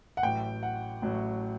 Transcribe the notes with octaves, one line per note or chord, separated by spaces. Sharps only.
F#5
A1 A2 F#3 G5
F#5
A1 A2 F#3